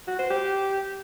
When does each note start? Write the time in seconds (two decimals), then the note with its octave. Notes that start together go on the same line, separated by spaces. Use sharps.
0.08 F#4
0.19 C5
0.31 G4